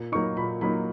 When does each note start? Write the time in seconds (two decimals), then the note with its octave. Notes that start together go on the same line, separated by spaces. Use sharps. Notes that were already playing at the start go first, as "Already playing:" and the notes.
Already playing: A#2
0.12 F#3 A#3 D#4 C#6
0.37 A#2 B5
0.61 F#3 A#3 D#4 B5